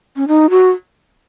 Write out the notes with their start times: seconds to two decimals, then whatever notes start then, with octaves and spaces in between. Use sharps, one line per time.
0.16 C#4
0.28 D#4
0.50 F#4